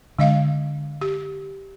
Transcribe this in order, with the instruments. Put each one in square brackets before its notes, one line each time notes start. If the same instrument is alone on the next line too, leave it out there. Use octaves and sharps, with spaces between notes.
[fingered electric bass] D3 [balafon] G#3 D#5 F5
[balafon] G4